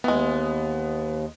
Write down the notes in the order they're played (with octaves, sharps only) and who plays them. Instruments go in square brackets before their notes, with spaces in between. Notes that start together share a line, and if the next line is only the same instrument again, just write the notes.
[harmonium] D#2 [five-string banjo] E3 G#3 [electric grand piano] B3